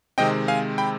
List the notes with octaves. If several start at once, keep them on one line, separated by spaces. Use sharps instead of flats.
C3 D#3 G#3 C4 D#5 G5
F5 G#5
G5 B5